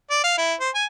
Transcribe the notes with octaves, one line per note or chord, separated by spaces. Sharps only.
D5
F5
E4
C5
G#5